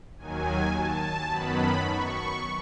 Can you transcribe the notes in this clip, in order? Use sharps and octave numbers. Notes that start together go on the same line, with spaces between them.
D#2 D#3 F#3 G#5
A5
F#2 D#3 F#3 B3 B5
C#6